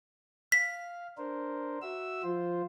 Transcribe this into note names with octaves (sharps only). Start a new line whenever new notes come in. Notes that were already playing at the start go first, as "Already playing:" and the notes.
F5 B6
D4 A#4 C5
F#4 E5 E6
F3 F4 C5